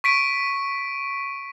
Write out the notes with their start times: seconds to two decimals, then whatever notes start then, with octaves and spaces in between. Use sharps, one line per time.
0.04 C#6 B6 D7 D#7